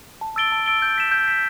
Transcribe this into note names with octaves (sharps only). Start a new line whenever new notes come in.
A5
E6 A6 D7 G7
A5
E6 A6 D7 G7
G6
B6 E7
G6
B6 E7